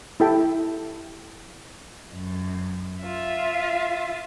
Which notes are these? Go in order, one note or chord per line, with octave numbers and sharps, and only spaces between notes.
E4 G4 A4 E5 G5
F#2
F4 E5